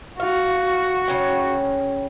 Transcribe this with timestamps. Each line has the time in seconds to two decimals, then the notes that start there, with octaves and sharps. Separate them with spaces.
0.20 F#4 F5
1.08 C#3 C#4 G5